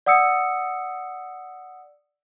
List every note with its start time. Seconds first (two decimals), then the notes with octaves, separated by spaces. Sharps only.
0.06 D5 F#5 D#6 E6 C#7